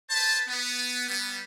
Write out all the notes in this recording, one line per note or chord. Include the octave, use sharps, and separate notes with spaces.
B4 C5 A5
B3
G3 B3